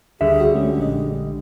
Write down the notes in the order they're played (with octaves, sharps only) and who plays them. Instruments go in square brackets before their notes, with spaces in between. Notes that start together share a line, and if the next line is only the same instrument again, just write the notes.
[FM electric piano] D2 [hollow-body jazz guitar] D3 G3 E5 [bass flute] G#4
[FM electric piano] C#2 F#4
[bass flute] G#3 [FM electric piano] A3 C#4
[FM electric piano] A#1 D4 D#5